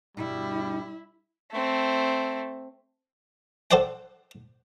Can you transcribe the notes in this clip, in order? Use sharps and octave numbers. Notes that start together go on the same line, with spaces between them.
D2 G2 B2 G3 E4
A3 C4
A4 C5 D5 F#5 G5